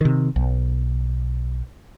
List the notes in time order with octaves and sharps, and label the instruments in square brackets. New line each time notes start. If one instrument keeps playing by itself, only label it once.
[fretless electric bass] C3 D#3
B1